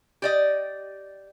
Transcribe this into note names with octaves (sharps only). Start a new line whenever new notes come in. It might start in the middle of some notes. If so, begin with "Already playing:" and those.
G4 D5 D#5